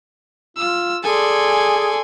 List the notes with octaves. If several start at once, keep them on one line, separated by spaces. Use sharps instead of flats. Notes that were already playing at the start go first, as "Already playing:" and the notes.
F4 E6
G#4 A4 D5 G#5 C6